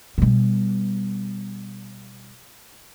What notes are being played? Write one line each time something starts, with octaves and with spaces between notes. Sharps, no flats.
B2 G3